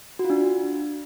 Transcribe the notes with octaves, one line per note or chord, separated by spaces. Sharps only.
F#4
F4
D4